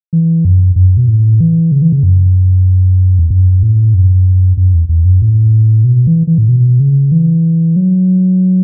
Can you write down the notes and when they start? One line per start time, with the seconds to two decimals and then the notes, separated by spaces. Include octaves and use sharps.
0.13 E3
0.45 F#2
0.76 F#2
0.97 B2
1.08 A2
1.41 E3
1.72 C#3
1.82 E3
1.92 C#3
2.03 F#2
3.19 E2
3.30 F#2
3.63 A2
3.94 F#2
4.57 F#2
4.74 E2
4.89 E2
5.05 F#2
5.22 A2
5.84 B2
6.07 E3
6.27 E3
6.38 A2
6.49 B2
6.80 C#3
7.12 E3
7.76 F#3